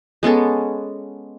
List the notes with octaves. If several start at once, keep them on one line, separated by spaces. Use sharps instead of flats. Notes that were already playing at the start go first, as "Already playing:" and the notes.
G#3 B3 C#4 A4